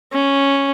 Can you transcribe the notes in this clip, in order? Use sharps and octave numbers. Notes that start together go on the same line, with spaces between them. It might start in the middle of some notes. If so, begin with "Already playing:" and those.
C#4